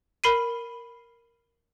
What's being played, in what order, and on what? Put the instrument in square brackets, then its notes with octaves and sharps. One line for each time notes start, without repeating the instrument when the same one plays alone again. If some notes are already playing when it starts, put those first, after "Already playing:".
[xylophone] A#4 B5 C7 D#7